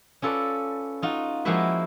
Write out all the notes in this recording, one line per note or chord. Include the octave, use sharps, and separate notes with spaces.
C#4 F4 A4 B4 D5
D#4 F4 F#4
F3 G#3 A#3 E4 F#4 B4